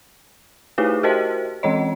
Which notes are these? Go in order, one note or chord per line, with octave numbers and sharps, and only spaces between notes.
A3 D#4 E4 G4 G#4 B4
F#4 G4 A#4 C5 D#5
E3 G#3 C4 C#5 D#5